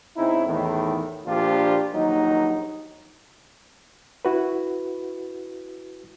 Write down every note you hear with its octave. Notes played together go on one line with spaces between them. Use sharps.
C#3 C4 D#4 E4
E2 A2 D#3
A#1 A#2 F3 D4 F4 G4
A#1 D#2 F#3 D#4
E4 F#4 B4